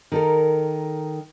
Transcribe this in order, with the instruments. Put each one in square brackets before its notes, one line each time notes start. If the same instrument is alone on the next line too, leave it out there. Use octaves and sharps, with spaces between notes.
[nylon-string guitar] D#3 A4 A#4